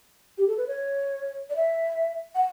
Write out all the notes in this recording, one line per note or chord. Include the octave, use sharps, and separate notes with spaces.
G4
A4
B4
C#5
D5
E5
F#5